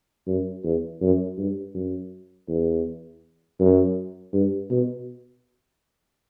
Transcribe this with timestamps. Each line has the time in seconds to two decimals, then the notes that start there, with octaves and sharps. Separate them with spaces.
0.27 F#2
0.64 E2
1.02 F#2
1.38 G2
1.74 F#2
2.48 E2
3.60 F#2
4.33 G2
4.70 B2